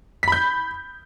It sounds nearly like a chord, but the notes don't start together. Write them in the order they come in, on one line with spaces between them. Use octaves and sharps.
B6 B5 G6